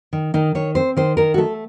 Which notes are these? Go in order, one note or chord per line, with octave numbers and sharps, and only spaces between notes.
D#3
D#3 D#4
D#3 C#5
C4 C5
D#3 C5
D#3 A#4
F#4
A3 A4